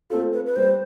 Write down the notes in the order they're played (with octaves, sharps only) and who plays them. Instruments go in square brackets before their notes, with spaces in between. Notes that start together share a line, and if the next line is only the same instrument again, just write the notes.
[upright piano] A3 C4 F4 [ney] A4
[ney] B4
B4
[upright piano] G3 [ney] C5